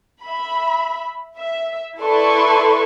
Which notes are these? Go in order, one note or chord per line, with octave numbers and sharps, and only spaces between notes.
E5 B5
E5
E4 A4 B4 D5 C6 C#6